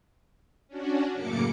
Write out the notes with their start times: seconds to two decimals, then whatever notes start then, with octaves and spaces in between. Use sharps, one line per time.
0.68 C#4 D4 F#4
1.14 F#2 A2 C#3 A#3 D6 C#7